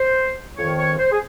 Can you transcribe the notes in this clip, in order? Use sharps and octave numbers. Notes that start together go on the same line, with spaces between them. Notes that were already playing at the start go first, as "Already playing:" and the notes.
Already playing: C5
F2 D#3 C#5
C#5
C5
G#4